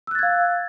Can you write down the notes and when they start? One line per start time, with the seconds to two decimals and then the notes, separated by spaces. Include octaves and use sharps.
0.07 E6
0.11 F#6
0.15 A6
0.19 G#6
0.23 F5